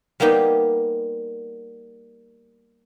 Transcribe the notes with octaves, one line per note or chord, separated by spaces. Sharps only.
G3 A#3 B3 D#4 G4